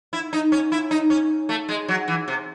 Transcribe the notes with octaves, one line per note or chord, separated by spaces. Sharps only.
E4
D#4
C#4
E4
D#4
C#4
A3
G#3
F#3
E3
C3